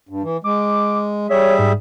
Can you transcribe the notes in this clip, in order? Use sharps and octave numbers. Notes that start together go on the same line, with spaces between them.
G2
E3
G#3 D6
G3 G#4 C#5 E5
G#2